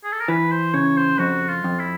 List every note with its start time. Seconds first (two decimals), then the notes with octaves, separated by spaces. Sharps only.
0.04 G#4
0.12 A4
0.21 A#4
0.28 E3 B4
0.51 C5
0.74 C#3 C#5
0.97 C5
1.19 F2 F#4
1.49 F4
1.64 F2
1.79 E4